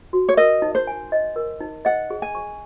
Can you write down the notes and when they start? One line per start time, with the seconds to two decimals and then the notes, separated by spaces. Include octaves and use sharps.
0.13 F#4
0.29 C#5
0.37 A#4 D#5
0.62 D#4
0.75 C5
0.87 G#5
1.12 D#5
1.36 A#4
1.60 D#4
1.85 D#5 F#5
2.10 G#4
2.22 G#5
2.35 C#6